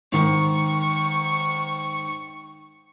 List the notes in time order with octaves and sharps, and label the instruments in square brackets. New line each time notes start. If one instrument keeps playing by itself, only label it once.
[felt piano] G#2 D#3 [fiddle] C#6